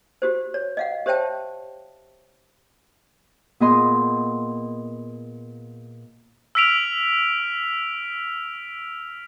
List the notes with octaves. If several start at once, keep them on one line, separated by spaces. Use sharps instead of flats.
F#4 G4 C5
C#5
D#5 F5 F#5
G4 C5 C#5 E5 G5 A5
A#2 B3 G#4 D#5 C6
E6 F6 B6 D7 F7